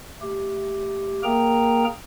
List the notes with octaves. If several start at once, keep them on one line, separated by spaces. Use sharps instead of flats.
A3 G4
A#3 G#4 A#4 G5 A#5